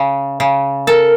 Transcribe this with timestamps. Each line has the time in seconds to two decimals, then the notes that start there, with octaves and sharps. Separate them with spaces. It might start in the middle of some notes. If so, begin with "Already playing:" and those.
Already playing: C#3
0.40 C#3
0.87 A4 A#4